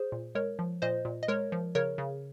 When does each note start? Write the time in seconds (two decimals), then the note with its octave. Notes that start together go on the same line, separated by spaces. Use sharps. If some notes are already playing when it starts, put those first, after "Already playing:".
Already playing: G#4 C5
0.12 A#2
0.35 G#3 A#4 C#5
0.59 F3
0.82 A#2 C5 D#5
1.05 A#2
1.23 D#5
1.28 G#3 A#4 C#5
1.52 F3
1.75 C#3 A#4 C#5
1.98 C#3